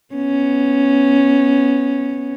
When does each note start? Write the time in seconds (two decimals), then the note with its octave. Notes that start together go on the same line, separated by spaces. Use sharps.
0.15 B3 C#4